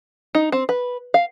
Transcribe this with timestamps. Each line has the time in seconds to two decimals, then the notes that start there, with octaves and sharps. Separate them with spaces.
0.35 D#4
0.52 C4
0.69 B4
1.14 F5